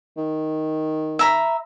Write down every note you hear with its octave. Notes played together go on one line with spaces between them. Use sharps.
D#3
E5 A#5 B5